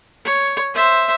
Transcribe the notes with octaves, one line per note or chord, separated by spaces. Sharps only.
C#5
C5 E5